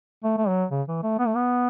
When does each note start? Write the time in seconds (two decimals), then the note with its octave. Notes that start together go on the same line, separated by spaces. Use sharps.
0.24 A3
0.38 A3
0.48 F#3
0.71 C#3
0.88 E3
1.03 A3
1.19 B3
1.27 A3
1.35 B3